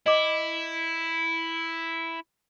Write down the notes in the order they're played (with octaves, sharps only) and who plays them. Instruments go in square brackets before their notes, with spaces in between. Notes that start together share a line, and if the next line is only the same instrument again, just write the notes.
[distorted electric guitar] E4 [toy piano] D#5 D6